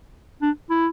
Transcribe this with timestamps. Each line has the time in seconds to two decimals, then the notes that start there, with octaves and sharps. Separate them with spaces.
0.42 D4
0.70 E4